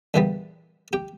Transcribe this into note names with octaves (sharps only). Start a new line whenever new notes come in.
E2 A#2 E3 G3 A#3 B3
G4 G5